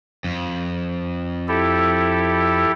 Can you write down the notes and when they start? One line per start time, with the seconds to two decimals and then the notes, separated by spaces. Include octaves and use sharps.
0.24 F2
1.48 E4 G4 A4